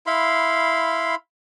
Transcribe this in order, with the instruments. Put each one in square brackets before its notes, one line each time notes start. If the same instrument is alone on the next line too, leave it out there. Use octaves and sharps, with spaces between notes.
[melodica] E4 F5 B5 C6